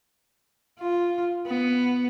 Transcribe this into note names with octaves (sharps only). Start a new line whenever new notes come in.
F4
B3